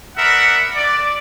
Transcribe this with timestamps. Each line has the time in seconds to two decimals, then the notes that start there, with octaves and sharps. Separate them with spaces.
0.17 A#4 B4 D5 E5 F#5
0.75 D5